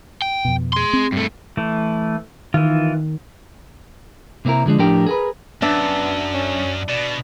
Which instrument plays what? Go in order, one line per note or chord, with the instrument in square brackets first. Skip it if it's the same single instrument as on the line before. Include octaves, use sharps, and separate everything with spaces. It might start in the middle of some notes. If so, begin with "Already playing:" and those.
[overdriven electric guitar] G5
[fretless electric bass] F2 B2
[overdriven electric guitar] G#4 C6
[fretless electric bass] C4
[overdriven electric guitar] G2 A3
[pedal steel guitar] E3 A3
[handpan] D#3 [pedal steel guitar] E3 F4
[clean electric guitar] C3 A#3 C4 E4 A#4
D3 F3 G#3 D4
A2 F3 D4 G4 A#4 G5
G#4 A#4 B4
[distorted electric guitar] F#2 [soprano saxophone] B3 [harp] D4 E5
[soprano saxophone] C#4
[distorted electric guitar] B2 [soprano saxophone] D5